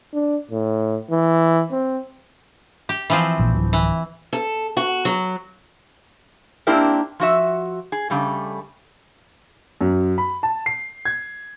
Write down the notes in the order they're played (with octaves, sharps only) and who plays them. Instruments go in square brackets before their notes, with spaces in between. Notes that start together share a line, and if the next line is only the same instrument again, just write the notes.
[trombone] D4
A2
E3
C4
[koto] G4
E3 F3 C4
[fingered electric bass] A#1
D1
[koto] E3
[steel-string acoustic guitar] A4
F#4
F#3
[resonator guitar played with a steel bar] A#3 C4 D4 E4 G4 A#4
F3 F#4 E5
G#4
C#3 G3 A3
[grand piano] F#2
B5
A5
C7
G#6